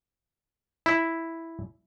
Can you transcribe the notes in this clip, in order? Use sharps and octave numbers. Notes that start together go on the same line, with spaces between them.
E4